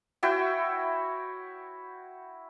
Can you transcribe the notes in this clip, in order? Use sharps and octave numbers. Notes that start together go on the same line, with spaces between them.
E4 F#4 C#5 G5